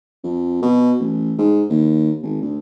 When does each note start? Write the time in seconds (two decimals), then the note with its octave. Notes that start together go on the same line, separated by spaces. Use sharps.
0.24 F2
0.62 B2
1.00 A1
1.38 G#2
1.70 D#2
2.23 G#1
2.42 D2